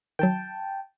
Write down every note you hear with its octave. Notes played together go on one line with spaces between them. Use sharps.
D#3 F#3 G5 A5